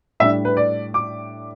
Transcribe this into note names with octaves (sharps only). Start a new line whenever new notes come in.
A2 G3 D4 E5
B4
D5
D6